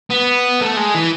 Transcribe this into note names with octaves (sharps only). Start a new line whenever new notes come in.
B3
A3
G#3
E3